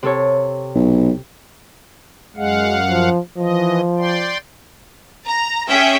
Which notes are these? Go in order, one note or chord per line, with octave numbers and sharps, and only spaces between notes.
C3 A4 C#5
B1
F#2 G#3 F5 F#5
F3
E3 F3 D#5
D5 G5 C6
A#5
C#4 G#4 E5 G5